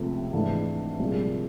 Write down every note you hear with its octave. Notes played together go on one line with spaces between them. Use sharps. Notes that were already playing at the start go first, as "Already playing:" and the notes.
Already playing: C#2 C3 F3 A3
G#2 E3 A3 D4
C2 A#2 F3 G#3